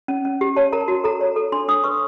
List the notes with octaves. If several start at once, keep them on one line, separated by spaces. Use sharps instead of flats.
C#4
C#4
G4
C#5 A5
A#4 A#5
A5
F#4
A4 A#5
C#5
A4
D4 C6
D4 D#6
B4 C#6